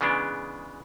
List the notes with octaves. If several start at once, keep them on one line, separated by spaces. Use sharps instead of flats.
C#3 E3 G#3 B3 D4